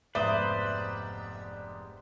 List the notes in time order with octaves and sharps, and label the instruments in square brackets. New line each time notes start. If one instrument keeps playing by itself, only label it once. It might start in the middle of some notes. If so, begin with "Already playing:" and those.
[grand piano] F1 G#2 B3 [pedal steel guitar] B4 C5 [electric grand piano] D5 D#6 [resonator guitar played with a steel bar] E5